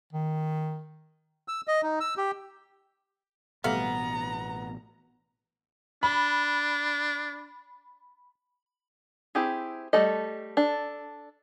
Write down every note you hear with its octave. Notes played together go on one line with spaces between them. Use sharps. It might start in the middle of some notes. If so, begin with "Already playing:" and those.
D#3
E6
D#5
D#4
E6
G4
A1 B2 G3 A3 B3 F5 A#5
D4 B5
C4 E4 G4 G#4
G3 A3 A4 D#5
D4 A4